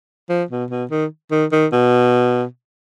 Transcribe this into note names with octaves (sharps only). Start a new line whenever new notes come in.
F3
B2
B2
D#3
D#3
D#3
B2